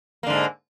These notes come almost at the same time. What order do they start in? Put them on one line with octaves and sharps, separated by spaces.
A#3 D3 G#2